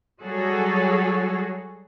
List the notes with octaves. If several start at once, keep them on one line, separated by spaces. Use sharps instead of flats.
F#3 G3 F#4 G#4 A4 C#5